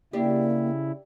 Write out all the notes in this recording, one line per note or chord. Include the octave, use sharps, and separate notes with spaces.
C#3 A#3 D4 E4 G4